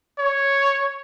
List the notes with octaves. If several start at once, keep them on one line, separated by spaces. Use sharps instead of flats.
C#5